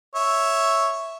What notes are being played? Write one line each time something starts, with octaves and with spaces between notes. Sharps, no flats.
C#5 E5